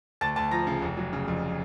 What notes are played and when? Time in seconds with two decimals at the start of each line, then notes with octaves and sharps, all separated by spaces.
0.21 D2 A5 A6
0.36 D2 A5 A6
0.51 F3 A#5 A#6
0.67 C#3
0.82 F1
0.97 F#3
1.13 C#3
1.28 F2